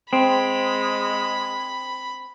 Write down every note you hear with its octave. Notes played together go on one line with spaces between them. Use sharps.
G#3 C4 B5